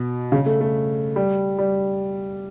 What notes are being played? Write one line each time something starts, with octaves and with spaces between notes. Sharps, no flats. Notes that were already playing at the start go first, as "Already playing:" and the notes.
Already playing: B2
C#3
A3
A3
G3
G3